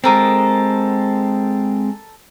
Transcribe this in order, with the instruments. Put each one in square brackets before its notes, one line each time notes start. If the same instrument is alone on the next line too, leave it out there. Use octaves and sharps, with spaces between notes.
[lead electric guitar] G#3 C4 [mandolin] A4 A#4 D#6